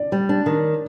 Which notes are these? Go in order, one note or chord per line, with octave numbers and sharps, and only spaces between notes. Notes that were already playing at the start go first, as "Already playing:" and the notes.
Already playing: D5
G3
D4
D#3